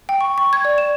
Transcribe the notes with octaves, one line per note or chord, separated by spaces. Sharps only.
G5
C#6
C#6
G#6
D5
E7